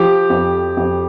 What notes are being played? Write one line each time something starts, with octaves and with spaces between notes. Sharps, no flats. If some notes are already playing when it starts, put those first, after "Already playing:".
Already playing: F3 G4
F2
F2